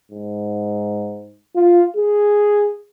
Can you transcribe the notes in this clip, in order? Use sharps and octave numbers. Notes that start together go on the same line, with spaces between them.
G#2
F4
G#4